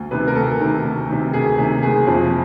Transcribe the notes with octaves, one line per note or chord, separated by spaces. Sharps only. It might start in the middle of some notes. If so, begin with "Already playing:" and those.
Already playing: D2
C3 D#3 B4
A#4
D2 A4
C3 D#3
D2
C3 D#3
D2 G#4
C3 D#3
F#1 G#4
F2 C3 F3